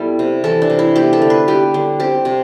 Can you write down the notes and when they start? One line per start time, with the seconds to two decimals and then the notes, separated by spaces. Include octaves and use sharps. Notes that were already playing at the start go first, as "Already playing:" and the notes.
Already playing: B2 G3 B3 E4 A4
0.19 C3
0.44 E3 A4
0.62 D4
0.70 C3
0.79 E4
0.96 B3 G4
1.13 A4
1.22 D3
1.30 B4
1.48 G3 G4
1.74 D3
2.00 C4 G4
2.25 C3